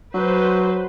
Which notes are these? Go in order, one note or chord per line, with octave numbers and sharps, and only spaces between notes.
F#3 B4 C5